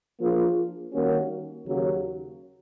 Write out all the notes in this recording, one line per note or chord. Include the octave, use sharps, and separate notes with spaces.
F3 A#3 D4 F4 G#4
D#3 G3 A#3 C#4 F#4
D#2 C#3 F#3